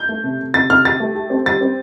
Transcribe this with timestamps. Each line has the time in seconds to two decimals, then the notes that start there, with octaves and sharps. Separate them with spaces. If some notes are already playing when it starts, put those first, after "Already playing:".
Already playing: G6
0.09 A3
0.24 C3
0.39 C3
0.54 C3 A6
0.70 C3 F6
0.85 G4 A6
1.00 A3
1.15 G4
1.30 C4
1.46 G3 A6
1.61 C4